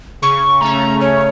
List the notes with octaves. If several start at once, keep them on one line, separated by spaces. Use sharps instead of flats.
C#3 C#6
A3 C#4 A#5
C#3 C#5